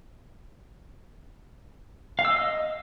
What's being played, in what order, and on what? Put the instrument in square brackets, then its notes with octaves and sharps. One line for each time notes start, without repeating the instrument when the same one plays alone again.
[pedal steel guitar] F5
E6
D#5